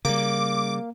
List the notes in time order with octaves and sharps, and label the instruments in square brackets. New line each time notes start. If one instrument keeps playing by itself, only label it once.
[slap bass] C#3 G3 [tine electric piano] A#3 [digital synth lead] D6